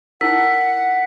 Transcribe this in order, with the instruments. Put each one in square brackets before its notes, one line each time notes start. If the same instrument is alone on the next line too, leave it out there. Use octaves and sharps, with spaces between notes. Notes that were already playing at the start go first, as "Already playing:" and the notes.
[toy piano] D#4 E4 A#4 [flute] F#5 [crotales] B6